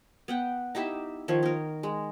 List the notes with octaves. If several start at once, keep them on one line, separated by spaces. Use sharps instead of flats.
B3 F#5 G5
D#4 E4 G4 E5
D#3 F3 C#5
D#4 A#4
G#3